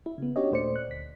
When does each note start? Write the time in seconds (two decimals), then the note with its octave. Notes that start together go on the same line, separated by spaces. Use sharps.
0.06 E4
0.18 C#3 B3
0.36 C#4 D4 F#4 G4 C#5 D#5
0.51 D#2 A#2 A3 C5 D5 C#7
0.76 F#6
0.88 D2 B6